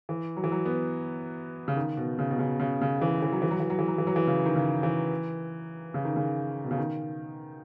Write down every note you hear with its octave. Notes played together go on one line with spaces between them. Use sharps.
E3
F#3
E3
F#3
B3
C#3
D#3
B2
C#3
B2
C#3
C#3
C#3
E3
E3
F#3
E3
F#3
E3
F#3
E3
F#3
E3
F#3
E3
C#3
D#3
C#3
E3
C#3
D#3
C#3
B2
C#3
D#3